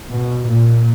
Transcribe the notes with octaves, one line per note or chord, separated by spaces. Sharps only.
B2
A#2